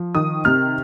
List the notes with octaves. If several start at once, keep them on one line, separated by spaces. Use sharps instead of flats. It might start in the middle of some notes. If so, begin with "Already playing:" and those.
Already playing: F3
D#3 D#6
C3 F6